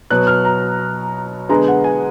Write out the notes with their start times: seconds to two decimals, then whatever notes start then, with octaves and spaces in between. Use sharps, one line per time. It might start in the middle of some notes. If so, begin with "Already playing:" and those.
0.11 B2 F#3 B3 F#6
0.27 F6
0.45 A#5
1.49 D3 G#3 B3 A#5
1.68 F#5
1.84 G#5